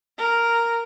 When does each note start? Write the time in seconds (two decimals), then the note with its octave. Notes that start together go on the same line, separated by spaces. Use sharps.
0.18 A#4